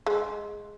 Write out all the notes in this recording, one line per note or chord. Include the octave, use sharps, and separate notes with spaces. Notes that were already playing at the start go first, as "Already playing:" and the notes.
G#3